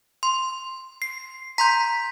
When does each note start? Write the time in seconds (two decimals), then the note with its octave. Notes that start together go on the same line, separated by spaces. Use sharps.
0.23 C6
1.02 C7
1.58 A#5 C6 G6 B6